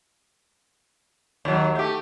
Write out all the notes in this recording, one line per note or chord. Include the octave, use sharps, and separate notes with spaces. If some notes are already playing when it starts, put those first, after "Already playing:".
D#2 F#3
A3 G4